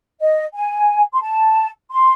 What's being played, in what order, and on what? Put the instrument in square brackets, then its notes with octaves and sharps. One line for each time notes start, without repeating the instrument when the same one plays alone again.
[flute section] D#5
G#5
C6
A5
C6